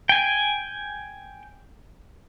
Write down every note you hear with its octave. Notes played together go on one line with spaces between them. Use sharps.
G5 G#5